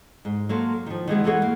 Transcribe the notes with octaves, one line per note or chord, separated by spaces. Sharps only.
G#2
F#3 A#3 A4 C5
D#3 F3
D#3 E3 G#3 B3
E2 E3 A3 F#4 G#4 C#5
A#3